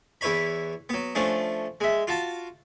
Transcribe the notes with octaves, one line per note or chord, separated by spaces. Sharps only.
E2 E4 B4 C#5 B5
F#3 B3
F3 A3 C#4 D4
G#3 E5
F4 F#4 A5